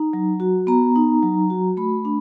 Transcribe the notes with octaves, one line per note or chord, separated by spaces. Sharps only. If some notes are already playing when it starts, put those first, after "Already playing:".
Already playing: D#4 A#5
F#3
F#4
B3 A#5
D#4
F#3
F#4
A3 B5
D4